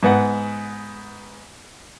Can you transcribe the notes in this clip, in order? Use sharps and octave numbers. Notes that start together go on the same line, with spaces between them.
G#2 B3 F#5